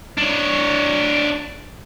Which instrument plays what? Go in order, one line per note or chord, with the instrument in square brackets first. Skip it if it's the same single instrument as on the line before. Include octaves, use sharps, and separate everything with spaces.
[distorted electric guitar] D4 C#5